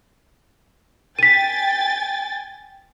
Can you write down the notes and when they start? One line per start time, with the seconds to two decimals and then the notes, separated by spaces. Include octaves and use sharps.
1.19 G5 G#5 A6 B6 D#7